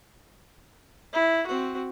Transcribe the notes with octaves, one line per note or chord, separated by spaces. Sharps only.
E4
C4 F#4